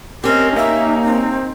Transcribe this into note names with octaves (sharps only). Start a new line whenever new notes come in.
C4 C#4 G4 A#4 D#5
A#3 D#4 E5
C4